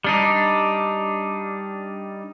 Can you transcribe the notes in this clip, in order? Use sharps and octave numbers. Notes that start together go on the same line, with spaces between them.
G3 D4 D#4